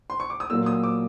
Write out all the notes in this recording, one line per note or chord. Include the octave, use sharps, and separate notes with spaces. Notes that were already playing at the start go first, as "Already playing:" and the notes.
C6
C#6
D6
D#6
A#2 F#3 A#3 E6
D#6
D6